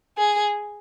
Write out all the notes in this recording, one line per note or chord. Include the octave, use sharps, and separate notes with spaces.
G#4